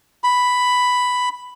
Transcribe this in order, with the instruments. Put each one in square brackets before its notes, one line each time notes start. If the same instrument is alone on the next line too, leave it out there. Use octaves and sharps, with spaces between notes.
[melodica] B5